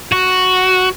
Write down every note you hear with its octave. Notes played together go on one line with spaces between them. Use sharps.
F#4